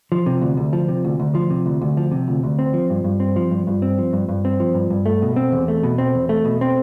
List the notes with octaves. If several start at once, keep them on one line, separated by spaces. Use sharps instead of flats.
F3
C3
D2
D2
F3
C3
D2
D2
F3
C3
D2
D2
F3
C3
D2
D2
C4
F3
G2
G2
C4
F3
G2
G2
C4
F3
G2
G2
C4
F3
G2
G2
A3
B2
C4
E2
A3
B2
C4
E2
A3
B2
C4